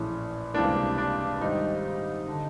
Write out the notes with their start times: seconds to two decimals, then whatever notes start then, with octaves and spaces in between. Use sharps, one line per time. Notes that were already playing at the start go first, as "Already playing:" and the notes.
Already playing: A#1 A2 E3 A3 C#4
0.54 C#2 C3 E3 G3 A#3 D4
0.98 D4
1.40 G#2 D#3 G3 C4 D#4
2.28 D3